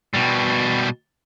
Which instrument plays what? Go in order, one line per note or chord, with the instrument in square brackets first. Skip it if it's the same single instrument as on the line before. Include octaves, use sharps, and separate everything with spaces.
[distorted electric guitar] B2 G3